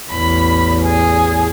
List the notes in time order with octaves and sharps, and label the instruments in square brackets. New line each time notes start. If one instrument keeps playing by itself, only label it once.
[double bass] A1 E2 [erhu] B5
[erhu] G#4